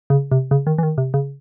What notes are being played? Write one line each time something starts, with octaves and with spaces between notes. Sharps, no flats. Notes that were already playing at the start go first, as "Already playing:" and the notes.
C#3
C3
C#3
D#3
E3
D#3
C3
C#3